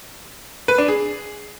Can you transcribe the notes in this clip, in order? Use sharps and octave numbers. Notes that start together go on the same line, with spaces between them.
B4
D4
G#4